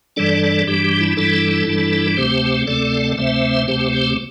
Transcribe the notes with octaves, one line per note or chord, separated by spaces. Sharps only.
G2 E3 G3 D4 A4 D5
G2 E3 G3 D4 G4
G4
E4
G2 E3 G3 D4 E4 A4
G2 E3 G3 D4
D2 C3 A3 C4 G4 C5
D2 C3 A3 C4 A4 D5
D2 C3 A3 C4 C5 E5
D2 C3 A3 C4 G4 C5
G4 C5